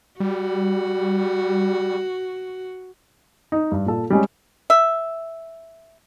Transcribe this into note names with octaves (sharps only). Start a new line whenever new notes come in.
G3 F#4
D#4
G2
A#2 A4
G3 G#3 C#4
E5